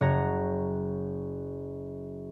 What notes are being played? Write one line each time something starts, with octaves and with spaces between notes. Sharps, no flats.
F#1 F#4 C#5 A#5